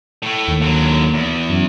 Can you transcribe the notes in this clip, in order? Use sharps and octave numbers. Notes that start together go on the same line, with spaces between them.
A2 A3
D#2
D3 F#3
E2
F#2